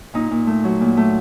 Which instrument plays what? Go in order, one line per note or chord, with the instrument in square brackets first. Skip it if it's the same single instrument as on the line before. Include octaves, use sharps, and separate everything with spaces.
[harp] A#2 D#4
A#2
A3
F#3
A#2
A3